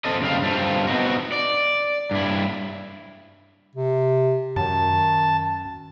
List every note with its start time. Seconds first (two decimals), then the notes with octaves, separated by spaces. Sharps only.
0.05 A3 C4 A4 D#5
0.22 F#2 C#3 G3 C4 F4 F5
0.42 G2 A3 C4 F4
0.87 B3 C4 D#4 F#4
1.32 D5
2.11 G2 E4
3.75 C3
4.56 F#2 D#3 A5